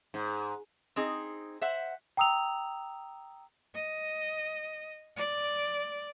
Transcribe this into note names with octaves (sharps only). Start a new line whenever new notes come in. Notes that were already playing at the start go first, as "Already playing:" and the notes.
G#2
C4 D#4 G#4
C5 E5 F#5
G5 A#5 D#6 E6 F7
D#5
D5